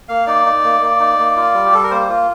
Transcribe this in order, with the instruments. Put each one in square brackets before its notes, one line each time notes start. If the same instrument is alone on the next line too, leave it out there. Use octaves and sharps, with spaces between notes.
[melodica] A#3 F5
D#4 D5
D#4
A#3
A#3
D#4
A#3
F4
G3
G4
G3 A4
A#4
A#3 C5
F4